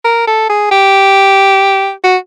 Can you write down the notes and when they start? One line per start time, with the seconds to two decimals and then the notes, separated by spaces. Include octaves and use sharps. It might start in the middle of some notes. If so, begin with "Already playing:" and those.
0.05 A#4
0.28 A4
0.50 G#4
0.71 G4
2.04 F#4